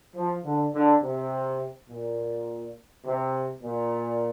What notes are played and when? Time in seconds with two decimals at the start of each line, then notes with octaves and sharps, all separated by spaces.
0.16 F3
0.45 D3
0.74 D3
1.02 C3
1.90 A#2
3.06 C3
3.63 A#2